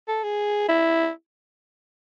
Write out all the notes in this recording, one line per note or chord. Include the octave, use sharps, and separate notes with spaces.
A4
G#4
E4